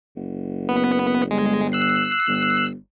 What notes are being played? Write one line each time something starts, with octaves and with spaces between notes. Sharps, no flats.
F#1
B3
G1 G#3
E6 F#6 C7
G1